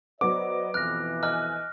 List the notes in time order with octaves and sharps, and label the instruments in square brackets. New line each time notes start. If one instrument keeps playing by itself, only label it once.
[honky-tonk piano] F#3 B3 [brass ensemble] C5 D5 D#5 [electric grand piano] D6
[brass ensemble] F2 B2 E3 [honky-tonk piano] F6 [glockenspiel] F#6 A#6
[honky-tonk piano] D#5 G#5 F#6 [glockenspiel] F6